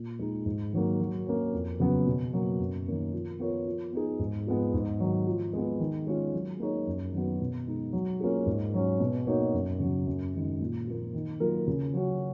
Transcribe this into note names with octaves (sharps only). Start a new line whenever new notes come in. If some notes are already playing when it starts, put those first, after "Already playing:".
Already playing: A#2
G#3 D#4
G#2
D#3 F#3 A#3
F#3
A#3 C#4
F2
C#3 F#3 B3
B2
F#3 A#3
F#2
D#3 A#3 C#4
F3
B3 F4 A#4 C#5
F3
B3 D#4 G#4
G#2
F3 G#3 B3
G#2
D#3 F#3
F3
G#3 B3
D#3
G#3 C#4 F4
F#3
A#3 D#4 G#4 C#5
F#2
D#3 F#3 B3 F#4
B2
G#3 D#4
F#3
A#3 C#4 F4 G#4
G#2
F#3 C#4
B2
A#3 D#4 F#4 C#5
F#2
C#3 F#3
F#2
D#3 G#3
A#2
F3 A#3
D#3
F#3 A#3 F4 A#4
C#3
F#3 C#4 F#4